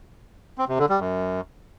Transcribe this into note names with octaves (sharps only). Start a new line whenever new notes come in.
C4
C3
D3
G3
F#2